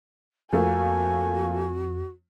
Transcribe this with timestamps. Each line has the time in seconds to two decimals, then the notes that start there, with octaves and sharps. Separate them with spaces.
0.53 F2 F3 A3 A#3 F#4 G#5